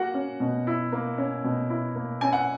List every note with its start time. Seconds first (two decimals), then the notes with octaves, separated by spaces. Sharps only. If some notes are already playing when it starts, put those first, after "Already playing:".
Already playing: A#3 F#4 F#5
0.14 C#4
0.40 B2
0.67 E4
0.92 A#3
1.18 C#4
1.44 B2
1.70 E4
1.95 A#3
2.21 C#4 G#5
2.33 F#5